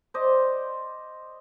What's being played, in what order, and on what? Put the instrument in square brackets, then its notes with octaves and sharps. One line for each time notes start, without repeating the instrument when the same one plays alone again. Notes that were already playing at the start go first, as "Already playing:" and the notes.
[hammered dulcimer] C5 D5 D#5